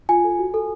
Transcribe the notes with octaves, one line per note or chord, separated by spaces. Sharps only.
F4 G#5
A4
F#4
A4